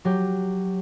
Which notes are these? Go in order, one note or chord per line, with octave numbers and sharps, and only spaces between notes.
F#3 G4